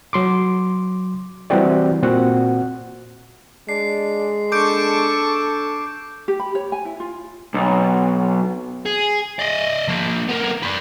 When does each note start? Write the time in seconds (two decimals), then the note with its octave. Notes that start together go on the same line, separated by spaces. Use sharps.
0.13 F#3 C6 D6
1.50 E3 G3 C4 F#4 G4 D5
2.03 A#2 C4 F#4 F#5
3.69 G#3 D4 C7
4.52 D4 A4 C#6 D6 G6 D7
6.28 G4
6.40 B5
6.55 C#5
6.72 G#5
6.85 E4
7.00 F4
7.54 B1
8.86 G#4
9.39 D5 D#5
9.88 F3 A#3
10.28 B3 A#4
10.63 B4 D5